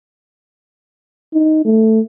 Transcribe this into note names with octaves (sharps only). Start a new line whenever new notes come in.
D#4
A3